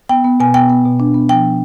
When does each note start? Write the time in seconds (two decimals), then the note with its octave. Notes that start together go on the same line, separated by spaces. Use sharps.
0.09 B3 G5
0.25 B3
0.40 B2 G#5
0.54 B3 G5
0.70 B3
0.85 B2
1.00 D4
1.14 B3
1.29 F3 G5
1.45 B3